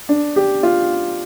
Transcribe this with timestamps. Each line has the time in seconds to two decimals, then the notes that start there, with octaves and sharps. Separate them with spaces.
0.09 D4
0.36 G4
0.63 F4